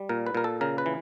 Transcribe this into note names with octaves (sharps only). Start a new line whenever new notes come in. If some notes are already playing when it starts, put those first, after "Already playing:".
Already playing: G3
A#2 A#4
B4
A#2 A#4
A4
C#3 A#4
B4
E3